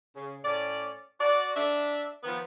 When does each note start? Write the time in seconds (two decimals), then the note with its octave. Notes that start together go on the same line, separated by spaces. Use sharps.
0.16 C#3
0.45 A2 C#4 D5
1.20 F#4 D5
1.56 D4 E5
2.24 D#3 F3 B3